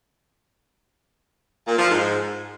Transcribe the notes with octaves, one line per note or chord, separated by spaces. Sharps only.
A#2
F3
G#2